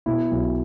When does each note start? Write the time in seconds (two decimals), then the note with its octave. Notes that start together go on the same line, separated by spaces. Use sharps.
0.06 B2 E4
0.31 B1